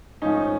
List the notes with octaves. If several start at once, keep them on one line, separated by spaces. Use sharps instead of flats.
G#2 F3 A3 C#4 D#4